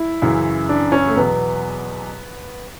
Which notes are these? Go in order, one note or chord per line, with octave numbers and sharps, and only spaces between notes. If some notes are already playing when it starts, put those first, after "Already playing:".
Already playing: E4
F#2 C#3 E3
D4
C#4
A3
E2 B2 F#3 B3